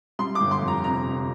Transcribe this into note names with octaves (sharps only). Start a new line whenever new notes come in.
G3 C6
D6
G1
C6
F2
A#5
C3 A#5
C3